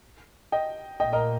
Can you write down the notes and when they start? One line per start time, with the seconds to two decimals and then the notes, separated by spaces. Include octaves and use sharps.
0.52 D#5 G5
1.00 A#2 A#3 D#5 G5
1.13 A#4 D#5